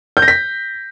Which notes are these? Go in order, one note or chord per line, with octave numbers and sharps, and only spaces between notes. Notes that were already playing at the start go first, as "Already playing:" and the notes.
G6
A#6
B6